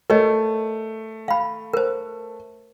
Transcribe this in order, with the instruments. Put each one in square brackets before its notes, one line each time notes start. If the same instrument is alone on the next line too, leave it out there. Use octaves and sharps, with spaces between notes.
[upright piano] A3 [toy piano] A#4 C#5 D#5
[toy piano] F5 B5
A#4 C5